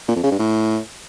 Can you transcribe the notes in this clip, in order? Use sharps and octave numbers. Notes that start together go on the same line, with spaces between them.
A#2
F2
C#3
G2
A2